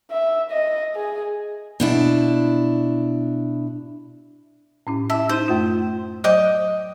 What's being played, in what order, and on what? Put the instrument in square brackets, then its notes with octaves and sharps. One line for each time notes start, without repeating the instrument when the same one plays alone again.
[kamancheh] E5
D#5
G#4
[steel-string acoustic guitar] B2 D4 E4
[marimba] A2 C#4 E4
[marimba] E4 A5 [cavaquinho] E5
[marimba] D#4 E4 [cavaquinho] C5
[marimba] F#2 A3 F4
[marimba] F#3 C5 D5 [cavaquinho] D#5 G5 D6